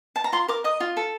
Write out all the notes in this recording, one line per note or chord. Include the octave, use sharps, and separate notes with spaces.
A5
A#5
F4 C6
A#4 D6
D#5 D#6
F4
A4